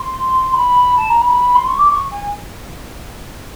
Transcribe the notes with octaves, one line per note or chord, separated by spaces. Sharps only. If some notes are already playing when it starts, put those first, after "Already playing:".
Already playing: C6
B5
A5
A#5
B5
C6
C#6
D6
C#6
G#5